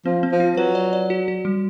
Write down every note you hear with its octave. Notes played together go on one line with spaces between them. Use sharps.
F3 C4
C4
F3
F4
F#3 B4
D5
D5
F#4
F#4
G3